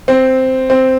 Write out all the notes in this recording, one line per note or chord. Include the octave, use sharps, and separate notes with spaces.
C4
C4